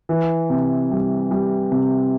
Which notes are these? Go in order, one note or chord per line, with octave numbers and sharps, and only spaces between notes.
E3
C3
G3
G3
C3